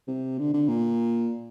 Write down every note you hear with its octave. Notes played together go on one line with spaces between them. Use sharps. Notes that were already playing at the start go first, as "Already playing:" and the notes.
C3
D3
D3
A#2